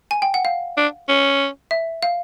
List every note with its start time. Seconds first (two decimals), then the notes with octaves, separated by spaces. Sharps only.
0.11 G#5
0.22 G5
0.34 F#5
0.45 F5
0.77 D4
1.09 C#4
1.71 E5
2.03 F5